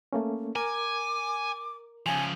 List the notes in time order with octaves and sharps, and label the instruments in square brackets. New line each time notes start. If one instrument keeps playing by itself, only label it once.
[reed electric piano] A3 A#3 C#4
[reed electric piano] A#4 [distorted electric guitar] G#5 [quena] D6
[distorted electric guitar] C#3 F3 [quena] G#5